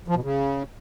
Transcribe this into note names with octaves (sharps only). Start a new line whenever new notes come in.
F3
B2
C#3